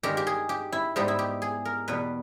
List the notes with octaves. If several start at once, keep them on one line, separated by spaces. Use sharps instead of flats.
G2 D#3 G#3 G4
G4
G#4
G4
E4
G#2 G3 B3 D#4 G4
E4
G4
G#4
A#4
E2 B2 G3 B4